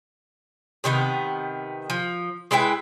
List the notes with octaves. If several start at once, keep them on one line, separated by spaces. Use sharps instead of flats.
C3 D#3 A3 B3
F3
G#3 E4 B4 G5